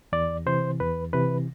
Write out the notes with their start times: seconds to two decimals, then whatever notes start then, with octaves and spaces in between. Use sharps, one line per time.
0.12 E2 D5
0.46 C3 E3 C5
0.80 E2 B4
1.13 C3 E3 B4